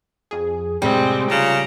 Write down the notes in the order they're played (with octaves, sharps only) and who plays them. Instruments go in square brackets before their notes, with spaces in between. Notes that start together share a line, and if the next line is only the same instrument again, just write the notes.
[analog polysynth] F2 G#4
[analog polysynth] A2 C3 [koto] G3 [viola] G#3 C4
[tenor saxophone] C#3 [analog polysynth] F4 [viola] A#5